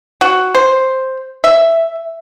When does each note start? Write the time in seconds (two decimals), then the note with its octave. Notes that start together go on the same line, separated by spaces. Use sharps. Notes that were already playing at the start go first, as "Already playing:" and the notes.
0.21 F#4
0.55 C5
1.44 E5